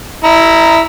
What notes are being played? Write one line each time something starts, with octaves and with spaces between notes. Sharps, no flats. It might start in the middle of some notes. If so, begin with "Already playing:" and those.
E4 A#5